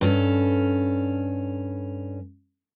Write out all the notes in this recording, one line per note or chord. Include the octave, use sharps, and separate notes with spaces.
G2 C#4 A4